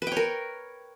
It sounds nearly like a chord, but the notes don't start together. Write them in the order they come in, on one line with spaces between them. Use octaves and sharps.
B4 G5 C#5 A#4